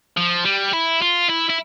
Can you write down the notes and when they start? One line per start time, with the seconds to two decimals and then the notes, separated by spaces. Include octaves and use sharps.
0.17 F3
0.45 G3
0.73 E4
1.01 F4
1.29 E4
1.49 E4